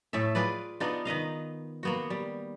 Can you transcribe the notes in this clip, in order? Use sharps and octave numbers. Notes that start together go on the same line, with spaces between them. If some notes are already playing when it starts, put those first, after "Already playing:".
A2 A3 A4 E5
F4 G#4 B4 D5
B3 D4 D#4 F4
D#3 B4 D#5 F5
A#3 B3 F#4
G3